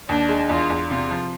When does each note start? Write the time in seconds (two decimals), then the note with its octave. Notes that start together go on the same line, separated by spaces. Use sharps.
0.08 D#2 D4
0.29 G#3
0.49 E2 F4
0.70 E2
0.90 C3 F4
1.11 F3